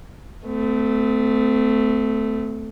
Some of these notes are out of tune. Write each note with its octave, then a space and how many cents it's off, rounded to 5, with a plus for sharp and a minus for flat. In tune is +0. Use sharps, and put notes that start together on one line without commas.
A3 +0 C4 -40